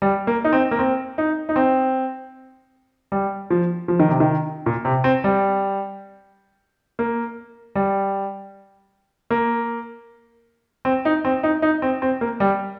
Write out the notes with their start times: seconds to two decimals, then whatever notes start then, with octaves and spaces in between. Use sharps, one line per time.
0.02 G3
0.27 A#3
0.44 D#4
0.53 C4
0.71 A#3
0.79 C4
1.18 D#4
1.49 D#4
1.56 C4
3.12 G3
3.50 F3
3.88 F3
4.00 D#3
4.09 C3
4.20 D#3
4.66 A#2
4.85 C3
5.04 C4
5.24 G3
6.99 A#3
7.75 G3
9.30 A#3
10.85 C4
11.05 D#4
11.25 C4
11.43 D#4
11.62 D#4
11.82 C4
12.02 C4
12.21 A#3
12.40 G3